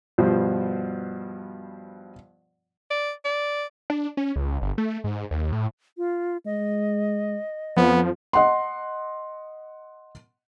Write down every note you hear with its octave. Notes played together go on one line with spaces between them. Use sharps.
G2 B2 F3 C5
D5
D5
D4
C#4
C#2
G1
A3
G#2
D#2
A2
F4
G#3 D#5
F2 F3 B3
D#5 F#5 C6